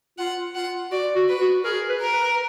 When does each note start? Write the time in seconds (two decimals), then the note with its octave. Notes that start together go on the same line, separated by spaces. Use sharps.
0.19 F4 F#5
0.55 F4 F#5
0.91 F#4 D5
1.16 F#4
1.28 B4
1.41 F#4
1.64 G#4 A#4
1.89 B4
2.01 A#4
2.13 B4